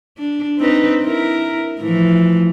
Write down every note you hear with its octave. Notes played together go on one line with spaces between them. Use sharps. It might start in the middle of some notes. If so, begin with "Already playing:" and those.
D4
C4 D#4 B4
E4 A#4
A2 E3 F3